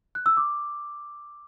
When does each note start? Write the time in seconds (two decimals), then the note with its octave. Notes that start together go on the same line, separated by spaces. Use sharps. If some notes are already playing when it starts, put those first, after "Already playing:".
0.15 F#6
0.26 E6
0.37 D6